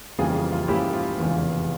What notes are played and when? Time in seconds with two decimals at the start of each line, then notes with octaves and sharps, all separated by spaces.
0.18 F2 C#3 E3 G3 A#3 F4 G#4
0.52 F4
0.68 G#2 F3 A#3 C#4 E4 G4
0.93 F4
1.18 F1 E2 C#3 E3 A#3